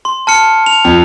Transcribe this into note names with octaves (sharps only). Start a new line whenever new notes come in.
C6
A5 F6 C#7
F7
F2